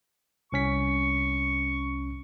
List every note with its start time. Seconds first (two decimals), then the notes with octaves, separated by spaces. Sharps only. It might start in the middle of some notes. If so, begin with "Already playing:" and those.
0.52 C2 C#4 C#6 B6